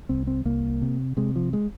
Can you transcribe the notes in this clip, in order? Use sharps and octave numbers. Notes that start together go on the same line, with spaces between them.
C2 C4
C4
C2 A#3
C3
C3 G#3
F3
G#3